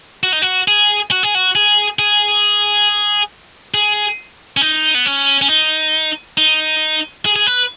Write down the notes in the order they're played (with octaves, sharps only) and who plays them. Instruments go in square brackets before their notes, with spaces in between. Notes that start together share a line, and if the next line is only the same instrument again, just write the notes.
[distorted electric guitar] F#4
D#4
F#4
G#4
F#4
G#4
F#4
G#4
G#4
G#4
C#4
D#4
B3
C#4
C#4
D#4
D#4
G#4
G#4
B4